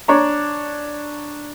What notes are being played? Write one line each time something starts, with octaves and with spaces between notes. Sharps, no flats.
D4 C#5 A#5